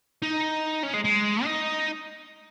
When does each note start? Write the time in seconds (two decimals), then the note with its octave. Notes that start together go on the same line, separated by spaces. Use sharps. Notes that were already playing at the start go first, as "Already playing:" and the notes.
0.22 D#4
0.83 C#4
0.94 G#3
1.04 G#3
1.44 D#4